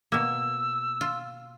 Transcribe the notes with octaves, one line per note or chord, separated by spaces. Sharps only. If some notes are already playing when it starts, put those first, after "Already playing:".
B2 A#3 E6
F4